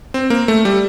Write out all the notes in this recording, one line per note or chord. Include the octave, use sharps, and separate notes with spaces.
C4
A#3
A3
G3